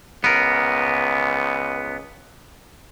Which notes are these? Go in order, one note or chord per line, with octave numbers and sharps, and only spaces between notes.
C#2 B3 A#4